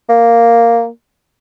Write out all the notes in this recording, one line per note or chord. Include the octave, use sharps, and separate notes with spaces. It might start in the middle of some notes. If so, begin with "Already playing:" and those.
A#3